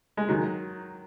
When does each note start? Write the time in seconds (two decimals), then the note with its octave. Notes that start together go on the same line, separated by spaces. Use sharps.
0.17 G#3
0.29 D#3 F#3